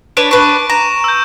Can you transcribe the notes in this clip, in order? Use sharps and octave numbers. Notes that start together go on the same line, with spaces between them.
D4 B4 C#5 D7
D4 B4 C#6
A#5 E7
E6 G6